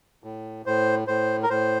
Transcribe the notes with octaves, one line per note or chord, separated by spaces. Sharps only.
A2
A2 C5
A2 C5
A#4
A2 C5